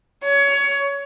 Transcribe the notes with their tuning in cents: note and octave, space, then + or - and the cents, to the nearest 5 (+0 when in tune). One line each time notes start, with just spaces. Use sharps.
C#5 +20